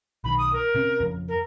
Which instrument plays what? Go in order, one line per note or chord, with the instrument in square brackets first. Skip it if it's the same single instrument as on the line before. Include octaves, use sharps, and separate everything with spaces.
[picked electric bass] B1 D#3 [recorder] B5
[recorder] D#6
A#4
[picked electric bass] C3 C4 C#4
F2 C#3 F3
[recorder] A#4